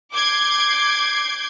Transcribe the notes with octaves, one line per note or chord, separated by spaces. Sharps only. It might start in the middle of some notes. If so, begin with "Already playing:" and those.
D6 G6 G#6 C7